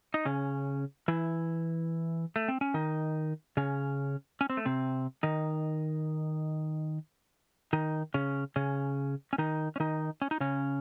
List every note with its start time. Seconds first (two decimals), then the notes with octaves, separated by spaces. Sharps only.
0.14 D#4
0.25 C#3 C#4
1.08 E3 E4
2.36 A3
2.48 C4
2.61 C#4
2.74 D#3 D#4
3.57 C#3 C#4
4.41 C#4
4.50 C4
4.57 A3
4.66 C3 C4
5.23 D#3 D#4
7.73 D#3 D#4
8.14 C#3 C#4
8.56 C#3 C#4
9.33 C#4
9.38 D#3 D#4
9.76 C#4
9.80 D#3 D#4
10.22 C#4
10.31 D#4
10.40 C#3 C#4